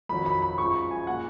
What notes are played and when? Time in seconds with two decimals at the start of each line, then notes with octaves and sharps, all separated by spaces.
0.09 F2 D#3 F#3 B5
0.26 B5
0.42 B5
0.58 F#2 F3 G#3 C#6
0.75 B5
0.91 G#5
1.07 A#2 G#3 F#5